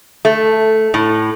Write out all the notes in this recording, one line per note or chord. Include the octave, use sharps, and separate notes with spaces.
A3
A2